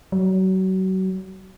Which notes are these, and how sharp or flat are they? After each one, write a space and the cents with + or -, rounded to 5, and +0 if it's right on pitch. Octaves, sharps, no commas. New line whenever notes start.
F#3 +30